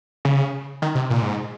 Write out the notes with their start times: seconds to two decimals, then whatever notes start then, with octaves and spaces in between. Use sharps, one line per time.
0.25 C#3
0.82 D#3
0.95 C3
1.10 A#2
1.22 G#2